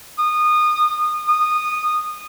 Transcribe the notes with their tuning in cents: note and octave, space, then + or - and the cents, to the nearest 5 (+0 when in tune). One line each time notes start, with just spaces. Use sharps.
D#6 -25
D#6 -15